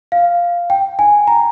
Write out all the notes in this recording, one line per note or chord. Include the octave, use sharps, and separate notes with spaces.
F5
G5
G#5
A#5